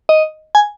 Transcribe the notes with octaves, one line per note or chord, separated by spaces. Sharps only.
D#5
G#5